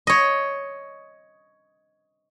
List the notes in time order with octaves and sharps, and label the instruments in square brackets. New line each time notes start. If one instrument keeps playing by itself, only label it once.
[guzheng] C#5 D#5